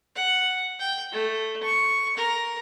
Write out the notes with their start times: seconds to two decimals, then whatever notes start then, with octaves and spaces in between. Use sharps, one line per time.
0.16 F#5
0.79 G5
1.12 A3
1.63 C#6
2.17 A#4